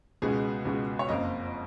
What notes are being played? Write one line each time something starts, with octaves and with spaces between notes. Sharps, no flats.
C#2 B2 G#3 G#4
C#2 B2 G#3
C#5
F#1 F2 F3 A#3 D#5